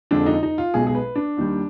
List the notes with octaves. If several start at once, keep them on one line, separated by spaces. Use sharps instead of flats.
F2 D3 F3 G#3 D4
D#4
D#4
F4
B1 B2 G#3 G#4
G#4
B4
D4
D#2 D#3 G3